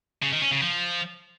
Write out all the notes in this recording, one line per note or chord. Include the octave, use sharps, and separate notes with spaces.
C#3
D#3
C#4
C#3
F3